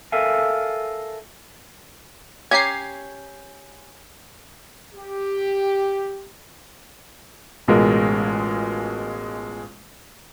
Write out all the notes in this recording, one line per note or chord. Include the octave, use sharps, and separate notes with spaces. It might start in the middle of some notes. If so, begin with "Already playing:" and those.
A4 A#4 E5 F5 G#5
C#4 G4 A#5 G#6 C7
G4
A1 B2 G#3 F4 A#4